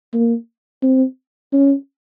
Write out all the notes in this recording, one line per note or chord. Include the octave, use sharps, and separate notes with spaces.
A#3
C4
C#4